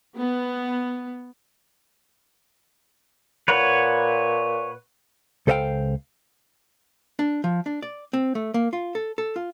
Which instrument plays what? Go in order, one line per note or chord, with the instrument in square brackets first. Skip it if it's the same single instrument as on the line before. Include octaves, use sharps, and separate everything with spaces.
[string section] B3
[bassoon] A#2 [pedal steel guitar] B4 C#5 F#5
[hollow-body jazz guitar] C#2 A4 C5 D#5 F5 G5
D4
F3
D4
D5
C4
A3
A#3
F4
A4
A4
F4